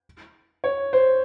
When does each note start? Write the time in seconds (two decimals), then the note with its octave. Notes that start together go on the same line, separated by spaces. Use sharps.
0.64 C#5
0.93 C5